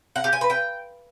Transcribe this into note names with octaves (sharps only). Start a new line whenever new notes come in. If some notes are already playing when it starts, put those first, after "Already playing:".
F#5
G4
G#5
B4
G5